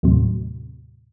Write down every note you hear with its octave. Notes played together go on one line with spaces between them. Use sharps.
D#2 A2 C3 F#3